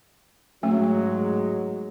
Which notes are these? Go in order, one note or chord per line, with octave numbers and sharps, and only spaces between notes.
G#2 F#3 G#3 A3 C#4